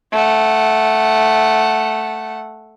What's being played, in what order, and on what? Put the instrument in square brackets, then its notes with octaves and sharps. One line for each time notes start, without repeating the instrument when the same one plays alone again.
[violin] A3 F#5